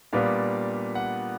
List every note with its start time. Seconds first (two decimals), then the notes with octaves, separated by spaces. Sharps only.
0.13 A#2 G3 B3 D4 F5
0.95 F#5